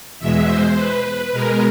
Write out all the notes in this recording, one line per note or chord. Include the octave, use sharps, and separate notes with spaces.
E2 B2 G#3 E5
C5
B4
B2 G#3 A#4